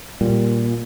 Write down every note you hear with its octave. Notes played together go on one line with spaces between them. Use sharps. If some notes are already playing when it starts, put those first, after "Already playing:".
A#2 G3